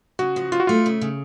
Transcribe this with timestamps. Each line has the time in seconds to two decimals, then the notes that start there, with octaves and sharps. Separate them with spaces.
0.19 C#3 F#4
0.36 F3
0.52 F3 F4
0.60 F#4
0.67 A3 F4
0.86 C#3
1.01 C#3